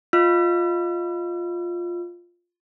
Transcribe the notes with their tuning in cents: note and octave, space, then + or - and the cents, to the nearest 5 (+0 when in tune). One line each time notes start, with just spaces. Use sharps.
F4 +5 D#5 +0 E6 +45